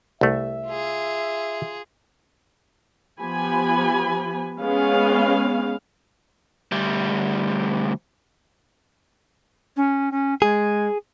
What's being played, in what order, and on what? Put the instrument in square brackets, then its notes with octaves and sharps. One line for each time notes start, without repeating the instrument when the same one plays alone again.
[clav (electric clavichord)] C2 A3 [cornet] E5
[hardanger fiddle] F4 G#4
[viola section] F3 B3 G4 G#5 B5
G#3 B3 C#4 G#4 F5
[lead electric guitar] D2 G3
[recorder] C#4
C#4
[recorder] G#3 [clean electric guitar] G#4